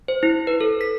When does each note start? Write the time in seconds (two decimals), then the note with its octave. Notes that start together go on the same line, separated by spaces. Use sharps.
0.08 C5
0.23 E4
0.47 B4
0.61 A4
0.81 B6